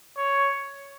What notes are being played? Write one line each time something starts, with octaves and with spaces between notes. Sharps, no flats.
C#5